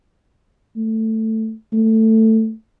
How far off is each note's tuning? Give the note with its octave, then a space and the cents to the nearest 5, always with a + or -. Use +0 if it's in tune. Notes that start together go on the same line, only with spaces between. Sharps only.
A3 +10
A3 +10